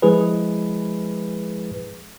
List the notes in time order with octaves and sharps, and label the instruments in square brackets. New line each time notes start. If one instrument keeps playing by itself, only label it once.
[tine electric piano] F3 G#3 E4 G#4 B4